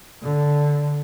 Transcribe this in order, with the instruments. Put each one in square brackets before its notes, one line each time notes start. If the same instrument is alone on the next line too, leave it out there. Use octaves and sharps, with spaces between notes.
[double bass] D3